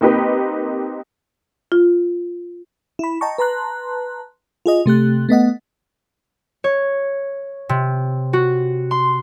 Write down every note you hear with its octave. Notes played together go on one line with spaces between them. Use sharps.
A#3 C4 D#4 G4 B4
F4
E4 B5
D#5 G5 A5 A#5 C#6
B4 A5 A#5 C6 F#6
F4 G#4 D#5
C3 A3 G4 F#6
A3 B3 D#5 F#5
C#5
C3
F#4
C6